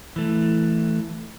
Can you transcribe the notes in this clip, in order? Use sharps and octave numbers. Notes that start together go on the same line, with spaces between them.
E3 A3